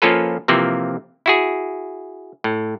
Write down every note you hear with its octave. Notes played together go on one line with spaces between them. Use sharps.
F3 A#3 C#4 F4 A4 B4
C3 E3 F3 A#3 C4
E4 F#4 G#4
A2